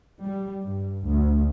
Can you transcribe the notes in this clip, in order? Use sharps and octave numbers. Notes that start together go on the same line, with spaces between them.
G3
G2
D2